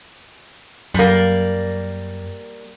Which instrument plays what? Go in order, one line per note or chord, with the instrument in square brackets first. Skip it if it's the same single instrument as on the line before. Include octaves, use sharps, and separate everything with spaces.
[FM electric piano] F#2 [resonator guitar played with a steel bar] G3 A#3